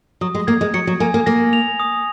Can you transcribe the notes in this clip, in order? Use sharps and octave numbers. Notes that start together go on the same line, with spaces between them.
F#3 D#6
G#3
A#3 G#6
G#3
F#3 C#7
F#3
A#3 G#5
A#3
A#3 A#6
F7
D#6